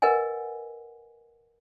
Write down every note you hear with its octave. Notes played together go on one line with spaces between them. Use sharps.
A#4 B4 D#5 F#5 G#5